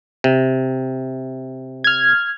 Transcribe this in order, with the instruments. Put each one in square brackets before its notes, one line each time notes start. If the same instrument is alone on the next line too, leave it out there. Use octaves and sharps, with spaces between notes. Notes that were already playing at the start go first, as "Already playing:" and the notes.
[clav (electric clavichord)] C3
[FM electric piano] F6 G#6